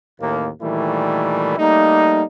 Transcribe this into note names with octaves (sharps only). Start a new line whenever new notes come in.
A1 D#2 A#3
A#2 D#3 E3 G3 A3 E4
G3 A3 A#3 D#4